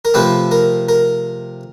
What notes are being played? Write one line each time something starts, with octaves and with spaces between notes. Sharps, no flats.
A#4
C3 F3 A3 C4 B4
A#4
A#4